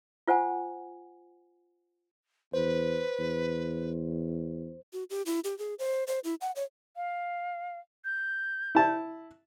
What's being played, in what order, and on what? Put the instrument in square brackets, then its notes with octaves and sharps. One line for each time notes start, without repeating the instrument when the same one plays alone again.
[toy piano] F4 C5 F#5 G#5
[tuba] E2 [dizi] B4 [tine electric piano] C5
[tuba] E2
[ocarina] F#4
G4
E4
G4
G#4
C5
C5
E4
F#5
C#5
[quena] F5
G6
[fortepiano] E4 A5